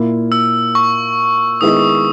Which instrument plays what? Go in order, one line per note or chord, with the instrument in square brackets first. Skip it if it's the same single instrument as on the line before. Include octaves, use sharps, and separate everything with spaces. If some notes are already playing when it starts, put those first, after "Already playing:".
Already playing: [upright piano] A#2 A#3 E4
[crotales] E6
C#6
[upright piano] D#3 G#3 B3 E4 G#4 [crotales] D#6